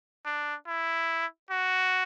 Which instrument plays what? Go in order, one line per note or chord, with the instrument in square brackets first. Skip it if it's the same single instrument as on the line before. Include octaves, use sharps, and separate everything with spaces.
[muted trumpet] D4
E4
F#4